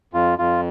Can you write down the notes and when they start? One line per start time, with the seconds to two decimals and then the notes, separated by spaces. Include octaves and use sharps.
0.13 F2 F4
0.38 F2 F4